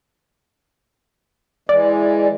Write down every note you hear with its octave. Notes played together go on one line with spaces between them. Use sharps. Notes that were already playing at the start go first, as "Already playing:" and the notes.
E3 G#3 D5